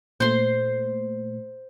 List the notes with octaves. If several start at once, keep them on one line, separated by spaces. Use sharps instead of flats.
A#2 A3 C5 C6